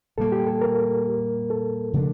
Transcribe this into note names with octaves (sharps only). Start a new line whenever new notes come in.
A#2 G3 A#3 A4
G4
A4
A#4
A4
C#3 F3 A3 D4